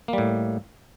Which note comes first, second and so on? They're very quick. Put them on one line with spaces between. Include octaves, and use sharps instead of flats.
A#3 G3 A2